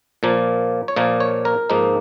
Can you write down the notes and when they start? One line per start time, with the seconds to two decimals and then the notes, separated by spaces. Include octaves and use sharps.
0.23 A#2 F3 A#3
0.88 C#5
0.96 A#2 F3 A#3 D#5
1.20 C#5
1.45 A#4
1.70 G#2 F3 A#3 D#4